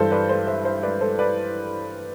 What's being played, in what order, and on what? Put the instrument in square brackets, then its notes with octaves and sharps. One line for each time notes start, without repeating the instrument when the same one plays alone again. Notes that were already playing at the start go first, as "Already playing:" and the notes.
Already playing: [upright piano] G2 E3 A4 C5
B4 D5
A4 C5
C5 E5
C5 E5
B4 D5
A4 C5
B4 D5